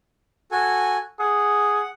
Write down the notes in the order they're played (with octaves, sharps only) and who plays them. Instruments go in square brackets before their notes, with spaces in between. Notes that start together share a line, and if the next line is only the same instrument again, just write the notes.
[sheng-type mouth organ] F#4 A4 G#5
[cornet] G#4 [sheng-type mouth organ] F#5